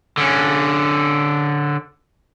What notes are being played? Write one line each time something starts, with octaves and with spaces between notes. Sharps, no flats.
D3 C#4